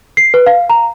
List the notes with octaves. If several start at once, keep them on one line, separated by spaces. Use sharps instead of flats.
C7
B4
F5
A#5